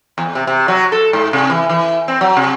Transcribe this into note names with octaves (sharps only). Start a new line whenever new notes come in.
E2
C3
C3
F#3
A4
G#2
C3
E3
E3
C4
F#3
C3